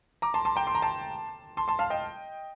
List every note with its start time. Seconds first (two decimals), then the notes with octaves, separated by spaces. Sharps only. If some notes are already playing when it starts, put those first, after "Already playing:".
0.22 A#5 D6
0.34 A5 C6
0.45 A5 C6
0.56 G5 A#5
0.67 C6
0.75 A#5
0.82 A5 C6
1.57 A5 C6
1.68 A5 C6
1.79 F5 A5
1.90 D#5 G5